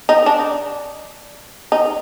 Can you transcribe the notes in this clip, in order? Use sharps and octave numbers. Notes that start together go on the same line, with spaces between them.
D#4
D4
D#4